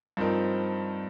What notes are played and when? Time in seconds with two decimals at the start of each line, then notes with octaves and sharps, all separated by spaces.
0.17 G2 F3 C4 D#4 A#4